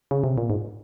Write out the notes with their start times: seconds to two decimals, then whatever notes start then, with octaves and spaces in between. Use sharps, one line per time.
0.11 C#3
0.24 C3
0.38 A#2
0.50 G#2